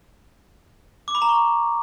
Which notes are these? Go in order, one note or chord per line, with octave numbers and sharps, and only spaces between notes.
D6
B5
A#5
C#6